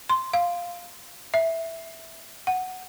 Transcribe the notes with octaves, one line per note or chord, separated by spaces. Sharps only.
C6
F5
E5
F#5